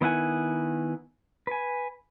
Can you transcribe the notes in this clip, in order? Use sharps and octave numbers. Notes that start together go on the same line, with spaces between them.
D#3 B3 E4 F#5 G#5
B4 G#5